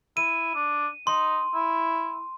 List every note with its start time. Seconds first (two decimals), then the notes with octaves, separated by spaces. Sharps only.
0.17 E4 D#7
0.55 D4
1.07 D#4 C6
1.54 E4